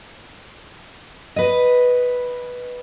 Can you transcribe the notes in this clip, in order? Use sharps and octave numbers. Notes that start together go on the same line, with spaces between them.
B4 D#5